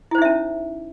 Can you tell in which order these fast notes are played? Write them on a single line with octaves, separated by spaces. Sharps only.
E4 C5 D#4 E5 C#4